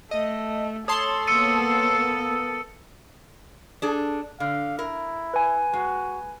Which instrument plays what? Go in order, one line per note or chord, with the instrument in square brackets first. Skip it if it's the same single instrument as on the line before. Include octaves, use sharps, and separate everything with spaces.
[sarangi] A3 [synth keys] D#5
[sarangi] A4 [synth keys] C#5 A5 C6 [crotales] D#6
[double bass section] A#3 B3 [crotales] E6 C#7 D#7
[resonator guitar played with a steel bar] D4 G#4 A4
[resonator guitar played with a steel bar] D3 [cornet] F5
[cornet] E4 [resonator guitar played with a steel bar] A#4
[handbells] B4 G#5
[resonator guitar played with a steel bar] G#3 [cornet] F#4